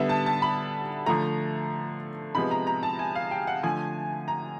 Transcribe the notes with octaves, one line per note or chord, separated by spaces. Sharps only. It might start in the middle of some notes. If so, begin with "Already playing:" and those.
Already playing: D3 G3 B3 E5
A5
A5
B5
D3 F3 A3 A#5
C3 F3 G#3 B3 B5
A#5
A#5
A5
G#5
F5
G5
F#5
D3 F3 A3 G#5
A#5